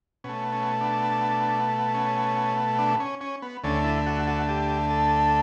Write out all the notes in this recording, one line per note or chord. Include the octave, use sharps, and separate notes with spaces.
B2 A3 C#4
C#4
D4
C#4
D4
C#4
C#4
B3
D2 D3 A3 C#4
E4
F#4
F#4
G4
A4